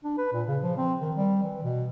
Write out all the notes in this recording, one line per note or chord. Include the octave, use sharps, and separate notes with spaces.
D4
B4
A#2
C#3
F3
C4
D#3
G3
E3
B2